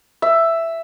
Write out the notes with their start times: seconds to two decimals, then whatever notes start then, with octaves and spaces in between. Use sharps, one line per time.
0.22 E5